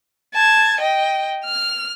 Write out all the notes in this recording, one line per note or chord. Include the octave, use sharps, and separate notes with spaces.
A5 G#6
D#5 G5
F6